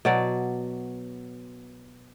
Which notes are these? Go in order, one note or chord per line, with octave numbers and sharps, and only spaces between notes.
B2 F#3 D5